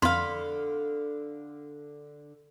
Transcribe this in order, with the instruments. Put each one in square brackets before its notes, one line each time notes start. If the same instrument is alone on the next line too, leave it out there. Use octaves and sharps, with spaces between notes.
[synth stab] F2 [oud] D3 [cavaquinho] F5 B5 [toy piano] C6